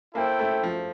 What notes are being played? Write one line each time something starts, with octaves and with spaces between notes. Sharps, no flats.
A#3 E4 A4 C5 G5
A3
F3